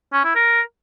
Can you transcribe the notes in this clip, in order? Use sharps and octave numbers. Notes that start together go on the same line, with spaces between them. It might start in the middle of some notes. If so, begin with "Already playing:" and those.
C#4
E4
A#4